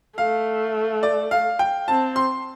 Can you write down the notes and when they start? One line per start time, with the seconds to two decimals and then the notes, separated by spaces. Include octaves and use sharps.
0.18 A3 F5
1.03 D5
1.31 F5
1.59 G5
1.88 C4 A5
2.16 C6